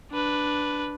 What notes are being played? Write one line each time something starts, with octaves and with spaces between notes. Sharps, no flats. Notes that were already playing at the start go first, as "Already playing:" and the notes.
D4 B4